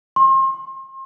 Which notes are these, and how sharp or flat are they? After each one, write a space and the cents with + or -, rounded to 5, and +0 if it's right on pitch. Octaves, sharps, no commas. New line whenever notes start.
C6 +35